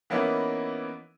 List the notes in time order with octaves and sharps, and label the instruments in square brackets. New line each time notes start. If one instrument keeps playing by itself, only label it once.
[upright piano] E3 A#3 B3 C#4 D#4 E4